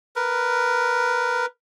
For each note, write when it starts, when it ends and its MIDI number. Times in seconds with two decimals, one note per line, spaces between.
0.16 1.46 70
0.16 1.46 71